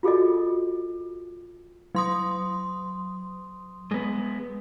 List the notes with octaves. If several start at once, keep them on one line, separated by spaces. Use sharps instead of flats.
F4 F#4 G#4 A4 D#5
F#3 C6 D#6
G#3 B3